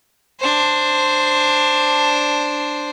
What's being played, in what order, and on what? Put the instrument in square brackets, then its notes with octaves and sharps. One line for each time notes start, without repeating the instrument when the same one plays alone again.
[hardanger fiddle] D4 C5